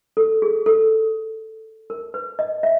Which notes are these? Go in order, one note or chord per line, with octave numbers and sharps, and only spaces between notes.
A4
G#4
A4
A#4
B4
D#5
E5